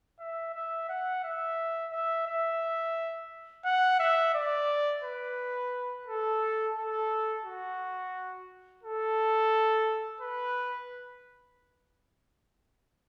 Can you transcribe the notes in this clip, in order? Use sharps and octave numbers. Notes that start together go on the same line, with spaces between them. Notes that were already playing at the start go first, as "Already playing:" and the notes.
E5
E5
F#5
E5
E5
E5
F#5
E5
D5
B4
A4
A4
F#4
A4
B4